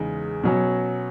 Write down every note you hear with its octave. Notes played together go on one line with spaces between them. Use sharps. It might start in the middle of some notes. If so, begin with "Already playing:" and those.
Already playing: E2 C#3 G#3 D#4
B2 F#3 C#4